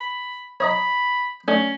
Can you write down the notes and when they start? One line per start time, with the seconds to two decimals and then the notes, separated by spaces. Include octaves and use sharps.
0.01 B5
0.60 C#5 D#5 A#5 B5
1.48 A3 C#4 D4